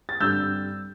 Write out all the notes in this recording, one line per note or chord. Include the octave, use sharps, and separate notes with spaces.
A6
G2 D3 G3 C4 E6 G6